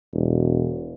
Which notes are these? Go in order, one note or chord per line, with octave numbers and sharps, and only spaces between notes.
E1